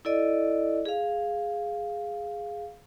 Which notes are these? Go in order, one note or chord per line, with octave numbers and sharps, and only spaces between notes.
E4 A4 D5 D#5
G#4 F5